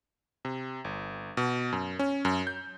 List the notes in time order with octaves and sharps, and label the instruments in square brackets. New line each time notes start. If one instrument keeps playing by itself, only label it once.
[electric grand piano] C3
G1
B2
F#2
C#4
F#2
G6